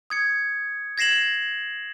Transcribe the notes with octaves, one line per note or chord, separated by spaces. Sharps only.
D#6 G#6 C#7
G#6 A#6 C7 E7 F#7